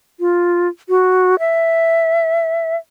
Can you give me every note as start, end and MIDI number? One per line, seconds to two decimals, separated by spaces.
0.20 0.68 65
0.89 1.39 66
1.39 2.76 76